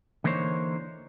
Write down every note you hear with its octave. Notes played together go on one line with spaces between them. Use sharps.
D3 E3 A#3 D#4 C5 C#5